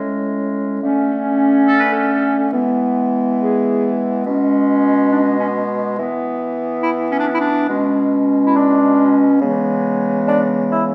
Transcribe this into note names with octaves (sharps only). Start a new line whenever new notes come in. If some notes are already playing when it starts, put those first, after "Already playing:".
Already playing: A2 G#3 C#4
D3 A3 C#4
A4
B4
A4
E3 G#3 B3
G#4
B2 G#3 C#4
D4
C#4
E3 B3
E4
C#4
D4
C#4
E4
D4
B2 G#3 C#4
E4
D4
C#3 E3 G#3 B3
D4
E4